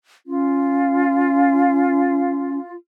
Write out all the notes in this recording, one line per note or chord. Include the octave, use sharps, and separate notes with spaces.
C#4 F4